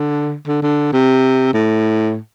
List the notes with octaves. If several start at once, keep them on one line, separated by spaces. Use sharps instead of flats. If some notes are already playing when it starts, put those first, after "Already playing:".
Already playing: D3
D3
D3
C3
A2